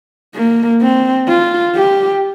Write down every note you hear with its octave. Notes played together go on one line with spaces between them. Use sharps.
A#3
C4
F4
G4